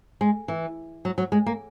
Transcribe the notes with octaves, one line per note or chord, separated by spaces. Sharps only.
G#3
E3
F#3
F#3
G#3
A#3